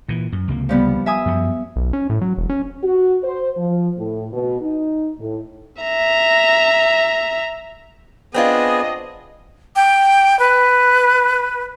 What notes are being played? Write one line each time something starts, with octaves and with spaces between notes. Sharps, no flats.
A#2 E3
F#2
C#2 C3 A#3
F3 G3 B3
E5 G#5 D#6
F#2 F3 F#3
B1
C#4
A2
F#3
E1
C#4
F#4
C5
F3
A2
B2
D#4
A2
E5 A#5
B3 C4 D4 F4 G#4 D#5
G5
B4